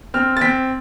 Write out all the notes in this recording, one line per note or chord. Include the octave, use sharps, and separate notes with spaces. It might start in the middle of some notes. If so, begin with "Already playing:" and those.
C4 F6
A6
C4 B6